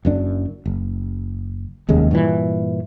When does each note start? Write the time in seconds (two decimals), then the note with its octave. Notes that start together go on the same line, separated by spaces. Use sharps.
0.05 F#1 F#2 D4
0.66 F#1
1.89 F1 D#2 C#3 G#3
2.11 G2 A#2 D3 E3